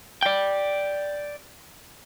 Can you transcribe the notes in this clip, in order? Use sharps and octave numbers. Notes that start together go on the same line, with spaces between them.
D5 G5